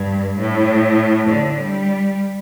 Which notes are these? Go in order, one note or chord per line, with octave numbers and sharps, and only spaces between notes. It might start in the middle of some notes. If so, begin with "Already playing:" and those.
Already playing: G2
A2
D3
G3